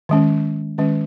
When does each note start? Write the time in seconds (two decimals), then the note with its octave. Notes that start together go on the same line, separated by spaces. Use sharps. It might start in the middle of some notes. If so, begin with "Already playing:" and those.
0.09 D#3 G#3 C#4
0.78 D#3 G#3 C#4